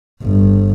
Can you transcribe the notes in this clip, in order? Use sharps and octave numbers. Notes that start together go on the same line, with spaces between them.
G1